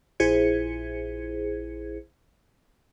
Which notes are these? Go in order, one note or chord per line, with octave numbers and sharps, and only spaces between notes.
A#1 E4 G#4 C5 G#6 C#7